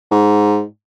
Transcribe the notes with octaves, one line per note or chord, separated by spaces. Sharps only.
G#2